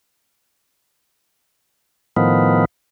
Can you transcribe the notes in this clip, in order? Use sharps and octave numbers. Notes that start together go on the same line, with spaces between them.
A2 D#3 F3 B3